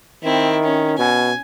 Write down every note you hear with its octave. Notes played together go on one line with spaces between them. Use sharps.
D#3 C4 E4
C#4
B2 G#5